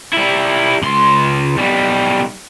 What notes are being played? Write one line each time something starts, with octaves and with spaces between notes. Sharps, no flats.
G3 E4
C#2 C6
B1 G3